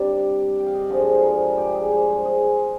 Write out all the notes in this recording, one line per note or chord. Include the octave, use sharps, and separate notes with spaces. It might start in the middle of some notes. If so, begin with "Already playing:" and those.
Already playing: C3 G3 D4 D5
G5
F5
D#5
D5
G2 D3 F3 G#3 C5
C5
A#4
G4
G#4
C5
C5
G#4